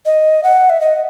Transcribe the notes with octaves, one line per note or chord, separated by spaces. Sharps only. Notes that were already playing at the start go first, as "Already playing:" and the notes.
D#5
F#5
E5
D#5